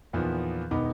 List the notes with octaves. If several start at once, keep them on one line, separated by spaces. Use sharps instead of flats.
E2 A#2 D#3 F3 B3
E1 D#3 B3 D#4 B5 D6